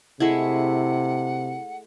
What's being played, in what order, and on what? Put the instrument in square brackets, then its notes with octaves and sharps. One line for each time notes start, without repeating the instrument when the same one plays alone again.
[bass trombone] C3 [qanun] G#3 A3 E4 [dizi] F#5